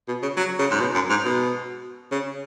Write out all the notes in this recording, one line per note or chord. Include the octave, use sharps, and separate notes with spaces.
B2
C#3
F#3
C#3
G#2
B2
F#2
G#2
B2
C#3